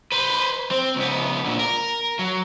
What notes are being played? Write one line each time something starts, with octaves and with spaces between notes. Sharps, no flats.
B4 C5
C4
C#2 B3
A#2 D3
A#4
F#3